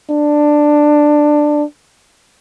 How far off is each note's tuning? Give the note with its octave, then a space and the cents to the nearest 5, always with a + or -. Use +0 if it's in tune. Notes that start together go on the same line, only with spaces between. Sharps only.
D4 +10